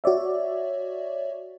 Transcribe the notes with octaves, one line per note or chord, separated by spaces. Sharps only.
F#4 C#5 D5 E5